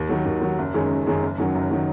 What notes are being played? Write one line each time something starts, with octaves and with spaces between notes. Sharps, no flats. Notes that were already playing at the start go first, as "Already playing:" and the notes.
Already playing: D#2
D#3 F#3
D#2
D#3 F#3
F#1
F#2 D#3 G#3 C#4
F#1
F#2 D#3 G#3 C#4
F#1
F#2 D#3 F#3
F#1
D#3 F#3